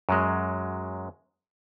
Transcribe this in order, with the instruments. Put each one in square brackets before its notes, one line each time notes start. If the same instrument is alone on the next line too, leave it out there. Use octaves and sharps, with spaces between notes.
[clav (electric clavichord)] F#2 F#3 G#3